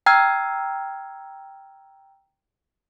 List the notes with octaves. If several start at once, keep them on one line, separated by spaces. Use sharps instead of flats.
G5 A#5 E6 F6 G#6